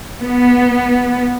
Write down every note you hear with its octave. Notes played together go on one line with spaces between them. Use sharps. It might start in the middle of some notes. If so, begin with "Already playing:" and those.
B3